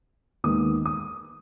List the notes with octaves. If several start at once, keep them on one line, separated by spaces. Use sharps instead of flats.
D#2 D#3 G#3 B3 D#6
D#6